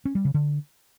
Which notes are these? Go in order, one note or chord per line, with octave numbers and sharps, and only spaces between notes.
C#4
G3
C#3
D3